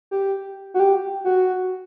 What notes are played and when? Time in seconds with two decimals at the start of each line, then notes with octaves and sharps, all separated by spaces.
0.11 G4
0.74 F#4
0.80 G4
1.25 F#4